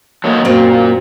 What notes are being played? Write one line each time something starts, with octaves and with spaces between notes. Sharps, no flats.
F#3 A#3 D#5
F#2 A#2 A#3 C4